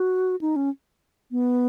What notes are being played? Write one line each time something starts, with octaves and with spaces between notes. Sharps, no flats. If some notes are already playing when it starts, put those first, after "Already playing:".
Already playing: F#4
D#4
C#4
B3